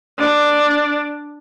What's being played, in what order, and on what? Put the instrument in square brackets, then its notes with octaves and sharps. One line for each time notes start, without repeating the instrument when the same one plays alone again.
[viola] D4